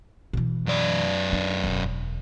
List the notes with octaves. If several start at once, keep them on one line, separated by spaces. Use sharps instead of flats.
B2 E3
F#2 D5
D4
E1